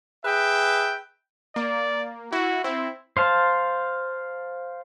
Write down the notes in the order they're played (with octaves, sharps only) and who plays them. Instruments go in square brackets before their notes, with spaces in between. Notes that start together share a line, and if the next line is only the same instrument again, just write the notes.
[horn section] G#4 B4 E5 G5
[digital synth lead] A#3 [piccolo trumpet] D5
[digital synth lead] E4 [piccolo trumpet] F#4
[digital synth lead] C4 [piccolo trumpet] E4
[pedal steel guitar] C5 F5 A5